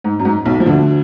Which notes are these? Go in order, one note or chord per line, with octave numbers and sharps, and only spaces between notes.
G#2
F#2
G#2
B1 B2
F3
D2 D3